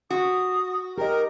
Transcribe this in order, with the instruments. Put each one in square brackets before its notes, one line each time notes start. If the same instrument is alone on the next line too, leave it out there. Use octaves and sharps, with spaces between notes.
[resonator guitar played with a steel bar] F#4 [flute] D#6
[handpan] G4 D#5 [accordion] A#4 [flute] G5